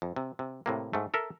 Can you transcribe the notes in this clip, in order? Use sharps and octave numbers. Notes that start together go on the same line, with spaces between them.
F2
C3
C3
A2 C3 A#3
G#2 A3
A4 A#4 E5